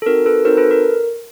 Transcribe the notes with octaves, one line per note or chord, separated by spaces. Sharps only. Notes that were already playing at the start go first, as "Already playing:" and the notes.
A4
C4 D#4 F#4 A#4
A4 B4
C4 D#4 F#4 A#4 C5
A4 B4
A#4